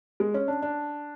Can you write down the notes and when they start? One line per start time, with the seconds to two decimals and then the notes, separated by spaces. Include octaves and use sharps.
0.20 G#3
0.34 C#4
0.48 D4
0.62 D4